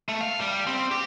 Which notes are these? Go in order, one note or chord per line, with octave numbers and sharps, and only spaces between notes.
A3
F5
G3
C4
G4